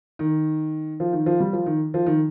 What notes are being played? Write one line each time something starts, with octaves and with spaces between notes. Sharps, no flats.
D#3
F3
D#3
F3
G3
F3
D#3
F3
D#3